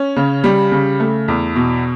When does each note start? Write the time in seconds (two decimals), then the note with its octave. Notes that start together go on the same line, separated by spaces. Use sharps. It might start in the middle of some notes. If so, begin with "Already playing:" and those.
Already playing: C#4
0.16 C#3
0.44 G3
0.72 C#3
1.00 A3
1.28 E2
1.56 B2